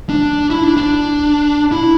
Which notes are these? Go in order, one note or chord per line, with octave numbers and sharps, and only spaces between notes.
D4
E4
D4
D4
E4